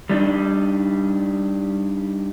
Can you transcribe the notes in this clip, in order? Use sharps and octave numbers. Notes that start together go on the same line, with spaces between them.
G3 D4 D#4